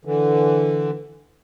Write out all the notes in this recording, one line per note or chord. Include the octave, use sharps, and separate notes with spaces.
D3 E3